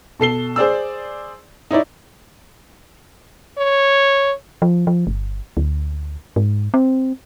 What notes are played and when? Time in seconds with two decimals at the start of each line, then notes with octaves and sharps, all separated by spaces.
0.20 B2 A4 C7 G7
0.56 G#4 C5 D5 E6
1.71 D#4 E4 C#5 D5
3.58 C#5
4.62 F3
4.87 F3
5.07 G1
5.57 D2
6.36 G#2
6.74 C4